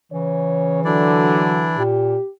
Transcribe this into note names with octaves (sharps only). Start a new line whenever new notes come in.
C#3 E3 C#5
D3 F#3 D4 E4 D5
A#2 G4